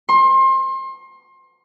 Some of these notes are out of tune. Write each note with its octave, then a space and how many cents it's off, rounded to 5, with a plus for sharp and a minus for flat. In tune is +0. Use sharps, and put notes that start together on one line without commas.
C6 +30